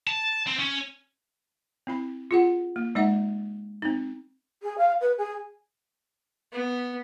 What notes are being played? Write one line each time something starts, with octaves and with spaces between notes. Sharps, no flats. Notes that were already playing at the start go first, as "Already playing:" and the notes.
A5
C4
C#4
C4 E4 B5
F4 G#4 F#5
A#3
G#3 D#4 E5 F#5
C4 D#4
G#4
F5
B4
G#4
B3